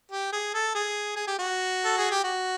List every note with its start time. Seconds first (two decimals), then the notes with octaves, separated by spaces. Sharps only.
0.11 G4
0.32 G#4
0.54 A4
0.74 G#4
1.16 G#4
1.27 G4
1.39 F#4
1.85 A4
1.97 G#4
2.10 G4
2.23 F#4